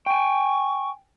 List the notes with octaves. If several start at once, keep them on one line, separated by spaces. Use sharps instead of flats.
G5 G#5 C#6